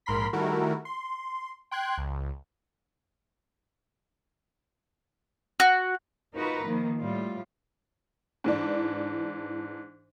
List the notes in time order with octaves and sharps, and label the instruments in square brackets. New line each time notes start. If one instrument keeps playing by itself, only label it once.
[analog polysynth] A#1 G#2 A#4 B5 C6 B6
D#3 G3 A3 E4 F#4 A#4
C6
G5 C6 F#6 G#6
C#2
[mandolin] F#4
[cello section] D#4 F4 F#4 A#4 B4
D#3 F3 A#3
A2 G3 F4
[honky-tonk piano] G#2 E3 D4